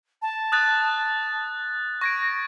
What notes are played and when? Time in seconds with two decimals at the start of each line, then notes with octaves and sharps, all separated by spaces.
0.22 A5
0.52 D#6 F#6 A6
2.01 C#6 G#6 A#6 D7